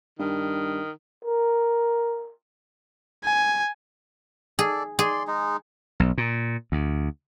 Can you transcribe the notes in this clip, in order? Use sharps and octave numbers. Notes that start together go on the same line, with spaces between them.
G2 D#3
A#4
G#5
G#4 A4 D5
G#4 D5 C6
G#3 D#4
B1
A#2
D2